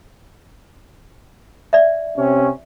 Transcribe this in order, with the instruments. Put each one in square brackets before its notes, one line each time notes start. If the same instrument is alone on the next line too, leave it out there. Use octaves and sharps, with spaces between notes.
[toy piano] D5 E5
[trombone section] C3 C#4